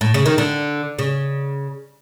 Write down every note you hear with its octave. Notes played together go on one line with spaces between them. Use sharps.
A2
C#3
D#3
D3
C#3